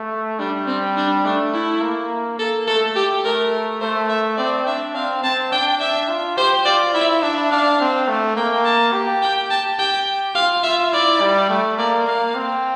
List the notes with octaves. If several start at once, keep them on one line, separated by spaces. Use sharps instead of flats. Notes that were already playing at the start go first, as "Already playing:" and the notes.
Already playing: A3
G3 D4
C4
D4
A3 D4
E4
A#3
A#3 A4
A3 A4
G4
A3 A#4
A3 C5
E5
C4 D5
D4 E5
C4 F5
C4 A5
D4 G5
D4 E5
F4
G4 C5
F4 D5
E4 E5
D4 E5
D4 F5
C4
A3
A#3 G5
A5
G4
G5
A5
G4 G5
F4 F5
F4 E5
E4 D5
G3
A3
A#3 D5
A#3 F5
C4